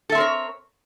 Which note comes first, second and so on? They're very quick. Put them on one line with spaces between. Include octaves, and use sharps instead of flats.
A4 E5 C4 A#4 C#5